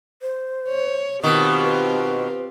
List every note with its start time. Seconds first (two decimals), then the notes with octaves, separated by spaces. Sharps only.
0.22 C5
0.68 C#5
1.24 B2 D#3 C4 F4 G4 D#6
1.64 B4